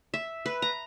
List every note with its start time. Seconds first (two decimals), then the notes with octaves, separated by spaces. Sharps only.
0.14 E5
0.46 B4
0.62 A#5